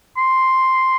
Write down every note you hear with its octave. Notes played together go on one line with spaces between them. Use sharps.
C6